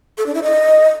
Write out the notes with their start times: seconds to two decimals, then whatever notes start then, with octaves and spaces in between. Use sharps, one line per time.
0.18 A4
0.26 D4
0.35 E4
0.43 D#5